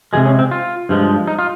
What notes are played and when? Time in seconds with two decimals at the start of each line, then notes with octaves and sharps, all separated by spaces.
0.13 C3 F3 G#3 G#4
0.25 C#4
0.39 C4
0.51 F4
0.89 G2 F3 G#3
1.27 D#4
1.39 F4